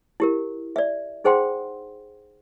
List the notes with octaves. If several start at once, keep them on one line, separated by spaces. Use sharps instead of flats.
E4 G4 A#4
D5 E5
D#4 G#4 C5 F#5 G5 C6